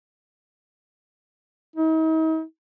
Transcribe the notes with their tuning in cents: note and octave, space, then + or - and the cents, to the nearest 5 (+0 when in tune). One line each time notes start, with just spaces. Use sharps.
D#4 +45